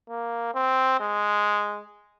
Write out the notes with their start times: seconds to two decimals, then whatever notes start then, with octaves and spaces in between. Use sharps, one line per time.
0.09 A#3
0.55 C4
1.00 G#3